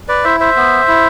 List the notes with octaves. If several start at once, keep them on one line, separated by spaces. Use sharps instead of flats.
B4 D5
E4 C5 E5
C5 E5
B3
E4